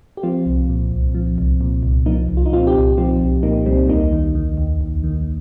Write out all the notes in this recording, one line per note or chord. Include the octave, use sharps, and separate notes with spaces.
G4
F3 C4 F4
C2
A#2
C2
F3
C2
A#2
C2
F3 A#3 D#4
C2
F4
D#4
A#2 C4 F4
D#4 G4
C2
F3 C4 F4
C2
A#2 A#3 D#4
C2 G3 C4
D#2 A#3 D#4
D#3
D#3
D#2
D#2
D#3